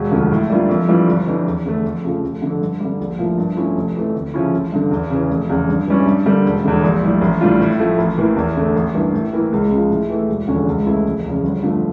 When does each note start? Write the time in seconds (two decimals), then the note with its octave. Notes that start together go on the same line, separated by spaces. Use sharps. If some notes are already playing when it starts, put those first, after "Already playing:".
Already playing: E1
0.12 D2 D3 F3
0.31 A2
0.50 G3 A#3 D4 F4
0.69 F2
0.88 E3 G3 D4 F4
1.08 G1
1.27 F2 E3 G3 D4
1.46 E2
1.65 D3 A3
1.84 F2
2.04 C#3 F3 A3
2.23 F1
2.42 F2 D3
2.61 G2
2.80 D3 G3
3.00 A#1
3.19 A2 F3 A#3
3.38 G2
3.57 F3 A3 C#4 E4
3.77 F1
3.96 F2 E3 A3
4.15 D2
4.34 C#3 F3 C#4 E4
4.53 A1
4.72 G2 D3
4.91 E2
5.10 C#3 E3
5.30 F1
5.49 E2 C#3
5.69 G2
5.87 E3 G3 C#4
6.06 G2
6.26 D3 G3 A#3
6.45 E1
6.64 E2 D3
6.84 A#1
7.03 A2 G3
7.21 A1
7.41 A2 G3 D4 F4
7.61 A2
7.79 F3 A3
7.98 A1
8.18 A2 E3 A#3
8.36 E2
8.56 D3 A3
8.76 A1
8.94 G2 E3 A#3
9.13 A2
9.33 E3 A#3 E4
9.52 C#2
9.70 C#3 F3
9.90 A2
10.10 E3 A3
10.29 E1
10.48 E2 D3 F3 C#4
10.67 C#2
10.86 C#3 E3 A3 E4
11.06 F1
11.24 E2 C#3
11.43 G1
11.63 G2 D3 F3 A3